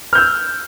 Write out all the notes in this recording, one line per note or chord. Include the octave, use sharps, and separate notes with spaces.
E6 F6 G6